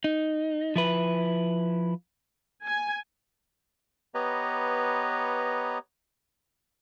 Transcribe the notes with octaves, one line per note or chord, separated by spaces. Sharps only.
D#4
F3 E4 B4
G#5
B3 G4 B4 C#5 D#5 A#5